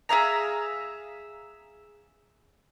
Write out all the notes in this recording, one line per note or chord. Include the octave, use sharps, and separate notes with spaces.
G#4 E5 F5 A#5